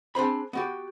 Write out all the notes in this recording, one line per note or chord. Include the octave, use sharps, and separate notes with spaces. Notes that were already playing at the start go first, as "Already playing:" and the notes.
C4 D4 G#4 C5 B5
B3 F#4 G4